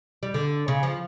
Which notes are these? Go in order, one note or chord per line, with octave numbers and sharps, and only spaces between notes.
G3
D3
C#3
F3